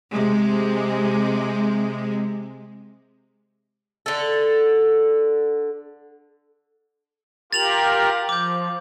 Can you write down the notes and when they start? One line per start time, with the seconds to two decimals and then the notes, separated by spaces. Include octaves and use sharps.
0.13 C3 G#3
4.06 D3 A4
7.53 F4 G4 A#4 A6 F7 F#7
8.29 F3 D6 G6